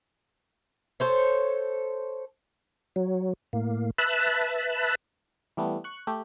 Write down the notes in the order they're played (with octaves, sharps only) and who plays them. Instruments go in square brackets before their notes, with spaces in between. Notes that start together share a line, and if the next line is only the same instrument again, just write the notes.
[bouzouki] A4 C5 C#5
[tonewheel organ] F#3
A2 A#3
B4 E5 A5 F#6
[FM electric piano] E3 G3 A3 B3
C#6 F#6
A3 G4